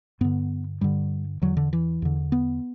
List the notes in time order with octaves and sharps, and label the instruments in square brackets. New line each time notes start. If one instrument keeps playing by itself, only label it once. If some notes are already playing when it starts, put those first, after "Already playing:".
[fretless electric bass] G2 D3 B3
G2 D3 G3
E2 D3 F#3
D3
E3
E2 D3
B3